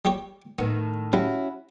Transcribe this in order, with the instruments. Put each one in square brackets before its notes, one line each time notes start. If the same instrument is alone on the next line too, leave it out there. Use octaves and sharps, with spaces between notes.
[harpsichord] G3 G4 C#5
[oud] A2 D#3 [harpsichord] B3
[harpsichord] G3 [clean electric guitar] C#4 E4 F#4